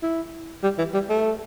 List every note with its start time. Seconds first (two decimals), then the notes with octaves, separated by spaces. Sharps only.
0.02 E4
0.63 G3
0.78 E3
0.94 G3
1.09 A3